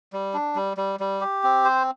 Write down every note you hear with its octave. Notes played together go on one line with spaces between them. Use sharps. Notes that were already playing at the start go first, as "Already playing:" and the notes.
G3
D4
G3
G3
G3
G4
C4
C5